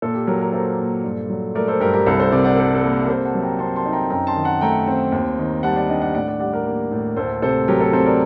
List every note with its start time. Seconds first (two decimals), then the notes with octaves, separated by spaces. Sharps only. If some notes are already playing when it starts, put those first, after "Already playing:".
0.02 A#2 A4
0.15 G4
0.27 F#3 G4 A#4
0.40 G4 A#4
0.53 A#3 A4 C5
0.79 A#2
1.04 G2
1.30 F#3
1.55 A3 A#4 D5
1.68 A4 C5
1.80 G2 G4 A#4
1.93 G4 A#4
2.06 C2 A4
2.20 A4 C5
2.32 C3 A#4 D5
2.44 D5 F#5
2.57 G3 A4
2.75 A4
2.84 A#3
3.02 A#4
3.08 C3 A4 C5
3.25 F#5 A5
3.34 F#3
3.43 G5 A#5
3.59 C4 A5 C6
3.76 A5 C6
3.85 D#4
3.93 G5 A#5
4.10 F#2 G5 A#5
4.27 A5 C6
4.35 D#3
4.44 F#5 A5
4.61 A3 G5 A#5
4.87 C4
5.12 D#2
5.38 D#3
5.63 G3 F#5 A5
5.76 D5 F#5
5.89 D4 D#5 G5
6.01 D5 F#5
6.14 A2 D5 F#5
6.28 D5 F#5
6.40 G3 D5 F#5
6.53 A#4 D5
6.66 A#3
6.92 A2
7.16 D2 A4 C5
7.42 C3 A4 C5
7.68 F#3 G4 A#4
7.81 A4
7.93 C4 A4 C5
8.05 A#4 D5